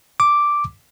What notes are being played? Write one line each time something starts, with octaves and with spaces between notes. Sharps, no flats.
D6